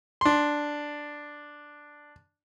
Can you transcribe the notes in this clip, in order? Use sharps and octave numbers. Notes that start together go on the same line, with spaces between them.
D4 C6